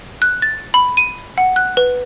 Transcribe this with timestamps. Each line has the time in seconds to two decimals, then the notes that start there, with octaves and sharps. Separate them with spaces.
0.22 F#6
0.42 A6
0.74 B5
0.97 D#7
1.38 F#5
1.56 F#6
1.77 B4